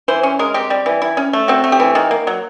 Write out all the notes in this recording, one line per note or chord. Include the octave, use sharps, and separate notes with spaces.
E3 C5
C#4
G#3 A#4
C4 G4
G3
E3
E4
C#4
A3
C4 F#4
A3
G4
E3
D#3
A#3
F#3